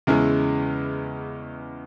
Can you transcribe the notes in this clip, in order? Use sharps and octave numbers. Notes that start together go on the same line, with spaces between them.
E2 C#3 G#3 C#4 E4